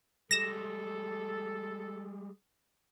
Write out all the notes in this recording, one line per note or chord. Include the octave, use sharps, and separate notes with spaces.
G3 G#3 A4 A#6 E7